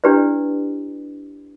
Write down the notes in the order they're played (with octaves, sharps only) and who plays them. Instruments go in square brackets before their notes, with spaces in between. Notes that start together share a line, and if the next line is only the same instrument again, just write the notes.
[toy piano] D4 E4 G4 B4 D5